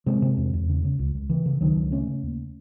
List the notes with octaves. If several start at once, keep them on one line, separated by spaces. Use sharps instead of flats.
C3 G#3 C4
C3
E2
E2
C#3
C#3
C#2
C#2
C#3 E3
C#3
C#2 D#3 F#3
C#2
C#3 A3 C#4
C#3
D#2